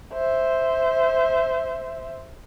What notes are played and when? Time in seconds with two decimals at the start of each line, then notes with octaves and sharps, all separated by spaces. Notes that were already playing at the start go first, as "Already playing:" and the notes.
0.13 C5 E5